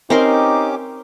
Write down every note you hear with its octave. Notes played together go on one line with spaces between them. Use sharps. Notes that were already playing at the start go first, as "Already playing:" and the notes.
C4 C#4 D#4 G4 A#4 C6 D6